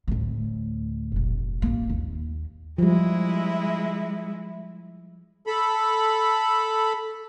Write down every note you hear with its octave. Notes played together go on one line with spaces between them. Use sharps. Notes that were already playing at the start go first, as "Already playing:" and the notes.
D2 A2
F1 A#1
A1 A#3
D#2
F3 G3 G#3 E4
A4 B5